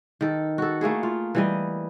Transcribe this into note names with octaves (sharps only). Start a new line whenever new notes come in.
D#3 A4
F#4 A4
A3 A#3 E4 G#4
F4
E3 G3 D#5